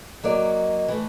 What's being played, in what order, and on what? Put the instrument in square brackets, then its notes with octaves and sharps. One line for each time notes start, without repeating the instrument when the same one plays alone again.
[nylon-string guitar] F#3 A#3 D5 [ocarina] D#5
[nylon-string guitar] E3 A3